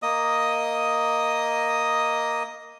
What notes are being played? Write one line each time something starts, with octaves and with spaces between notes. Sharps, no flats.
A#3 D#5 D#6